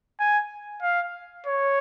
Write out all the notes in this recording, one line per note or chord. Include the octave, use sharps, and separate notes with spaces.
G#5
F5
C#5